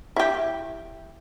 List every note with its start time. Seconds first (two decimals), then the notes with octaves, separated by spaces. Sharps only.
0.16 E4 G4